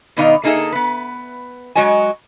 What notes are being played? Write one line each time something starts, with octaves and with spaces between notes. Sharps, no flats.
B2 D#3 B3 D#4 D5 F5
A3 A#3 D#4 G#4 A4 E5
B3 B4
F#3 G#3 F#4 C#5 D#5 G#5